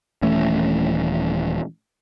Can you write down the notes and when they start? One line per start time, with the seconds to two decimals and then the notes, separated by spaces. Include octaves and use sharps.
0.22 D#1 E3 A3 C#4